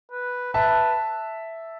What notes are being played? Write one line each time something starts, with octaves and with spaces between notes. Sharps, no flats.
B4
B4 E5 A5